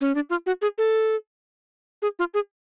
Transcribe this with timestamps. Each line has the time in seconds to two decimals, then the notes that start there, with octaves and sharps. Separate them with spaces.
0.01 C#4
0.15 D4
0.30 F4
0.46 F#4
0.62 G#4
0.78 A4
2.02 G#4
2.19 F4
2.34 G#4